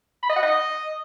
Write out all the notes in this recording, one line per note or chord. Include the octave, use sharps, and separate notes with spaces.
B5
D#5
F#5
D#5